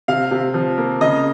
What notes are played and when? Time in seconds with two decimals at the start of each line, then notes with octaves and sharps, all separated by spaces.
0.08 C3 F5
0.31 C3
0.54 F3
0.78 A#3
1.01 C#3 D#5